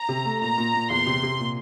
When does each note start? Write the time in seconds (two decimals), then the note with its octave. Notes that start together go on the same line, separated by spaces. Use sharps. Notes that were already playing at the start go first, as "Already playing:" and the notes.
Already playing: A#5
0.09 C3
0.25 A3
0.41 A#2 A#5
0.58 A#2
0.74 A#2
0.90 E2 C6
1.07 C3
1.23 C3
1.39 A#2